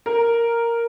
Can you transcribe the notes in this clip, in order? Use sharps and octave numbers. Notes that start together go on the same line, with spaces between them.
A#4